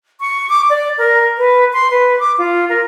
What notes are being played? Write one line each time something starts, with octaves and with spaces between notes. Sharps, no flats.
C#6
D6
D5
A#4
B4
C6
B4
D6
F4
A#4